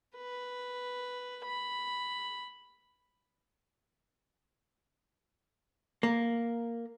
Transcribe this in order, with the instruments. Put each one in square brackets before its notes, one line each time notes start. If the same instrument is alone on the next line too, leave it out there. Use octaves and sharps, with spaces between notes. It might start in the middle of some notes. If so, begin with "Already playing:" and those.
[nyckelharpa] B4
B5
[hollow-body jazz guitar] A#3